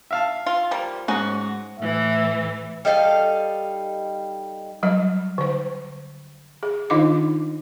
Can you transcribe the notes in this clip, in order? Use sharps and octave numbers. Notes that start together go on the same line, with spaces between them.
E5 F5 A5
F4
F3 G3 A#3
G#2 C#4 D#4 F#4
A2 E3 E5
G3 D#4 A4 F5
F#3 G3 D#5
D3 C5
G#4
D#3 D4 D#4 F4 D#5 D6